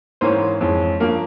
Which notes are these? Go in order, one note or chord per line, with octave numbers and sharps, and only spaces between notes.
G#2 E3 A#3 C#4 C5
F2 E3 G#3 C#4
G2 F3 A#3 C#4 A#4